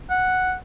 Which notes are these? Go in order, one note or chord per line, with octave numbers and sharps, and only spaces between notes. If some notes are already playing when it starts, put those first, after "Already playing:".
F#5